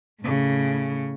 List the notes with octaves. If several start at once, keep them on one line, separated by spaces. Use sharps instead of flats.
A2 C#3